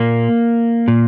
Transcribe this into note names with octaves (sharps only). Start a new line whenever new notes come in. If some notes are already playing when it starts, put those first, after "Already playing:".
Already playing: A#2 A#3
A#2